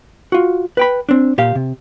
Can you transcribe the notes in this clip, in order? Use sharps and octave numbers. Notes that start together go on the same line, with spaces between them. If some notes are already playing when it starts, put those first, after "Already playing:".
F4 F#4
B4 G5 B5
C4 D4
A#2 G4 F5
C3